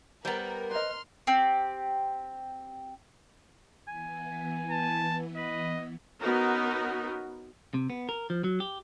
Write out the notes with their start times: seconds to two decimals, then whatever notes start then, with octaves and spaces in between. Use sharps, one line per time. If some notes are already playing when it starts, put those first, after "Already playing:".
0.25 G3 B3 A#4 C5 G5 A#5
0.71 B4 C5 D#5 C6 F6
1.27 C4 G4
3.88 E3 B3 G#5
4.71 A5
5.36 B4 D#5
6.20 B3 C#4 D#4 F#4 A#4
7.74 C3
7.90 B3
8.09 A#4
8.30 F3
8.44 F#3
8.60 G4